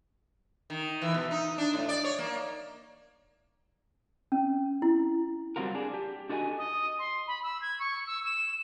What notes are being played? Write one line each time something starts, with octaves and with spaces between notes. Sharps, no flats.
D#3
E3
B2
D#4
D4
A2
D5
C#5
A#3
C#4
E4
F#3 G3 C4 F4 F#4 A#4
D4 G#4
G4
D4 F#4 A4 D#5 G5 G#5
D#5
C6
B5
E6
G#6
C#6
E6
E7